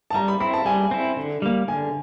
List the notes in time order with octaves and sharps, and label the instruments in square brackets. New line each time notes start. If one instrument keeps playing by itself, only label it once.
[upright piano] A5
[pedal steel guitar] G3 [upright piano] A#5
[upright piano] B5
[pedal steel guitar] C4 E4 [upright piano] B5
[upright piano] A5
[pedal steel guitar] G3 [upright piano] G#5
[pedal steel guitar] C4 E4
D3
G3 A#3
[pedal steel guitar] D3 [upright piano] G#5